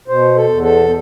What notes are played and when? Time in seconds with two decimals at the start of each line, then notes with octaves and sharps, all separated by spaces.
0.08 B2 C5
0.36 A4
0.48 E2
0.63 A4